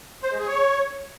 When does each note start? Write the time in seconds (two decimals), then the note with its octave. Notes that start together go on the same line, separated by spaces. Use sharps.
0.23 C5
0.31 G#3
0.39 G#4
0.47 C#5